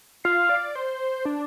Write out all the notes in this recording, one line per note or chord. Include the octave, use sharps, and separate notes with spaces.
F4 F5
D5
C5
D4